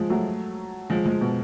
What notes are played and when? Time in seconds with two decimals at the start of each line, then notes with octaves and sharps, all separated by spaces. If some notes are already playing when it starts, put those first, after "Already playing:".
Already playing: F3 G#3
0.10 F#3 A3
0.90 F3 G#3
1.06 F3 G#3
1.21 B2